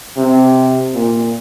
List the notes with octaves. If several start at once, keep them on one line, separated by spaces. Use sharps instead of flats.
C3
A#2